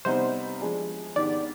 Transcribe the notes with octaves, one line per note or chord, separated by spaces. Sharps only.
C3 G3 B3 D#4 C5
F3 G#3 D4 G#4
G#2 D#3 B3 D4 G4 D5